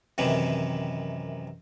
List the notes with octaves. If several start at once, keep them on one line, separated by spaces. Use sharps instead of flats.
F#2 C3 D#3 E3